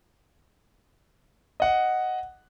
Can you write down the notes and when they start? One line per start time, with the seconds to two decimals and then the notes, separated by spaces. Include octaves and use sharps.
1.60 D#5 F#5